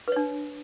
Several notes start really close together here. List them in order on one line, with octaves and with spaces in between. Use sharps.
B4 C#5 D4